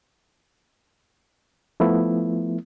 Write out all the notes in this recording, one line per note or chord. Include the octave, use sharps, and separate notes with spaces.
F3 A3 B3 E4